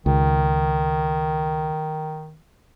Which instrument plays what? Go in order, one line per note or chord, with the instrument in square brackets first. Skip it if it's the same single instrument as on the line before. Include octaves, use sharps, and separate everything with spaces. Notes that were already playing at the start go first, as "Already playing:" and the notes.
[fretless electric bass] C#2 [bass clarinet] D#3